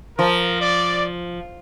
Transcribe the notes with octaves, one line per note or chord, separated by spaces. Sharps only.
F3 A#4
D5